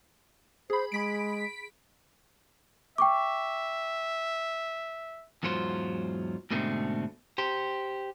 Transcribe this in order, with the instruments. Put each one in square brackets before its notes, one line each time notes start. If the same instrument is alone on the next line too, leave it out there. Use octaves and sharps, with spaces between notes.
[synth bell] G#4 B5 [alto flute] C5
[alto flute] G#3 [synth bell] B5 B6 D7
[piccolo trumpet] E5 [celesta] G5 C#6 D6
[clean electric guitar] E2 G#2 F#3 F4 C5
G#2 B2 D3 A3 C4
G4 C5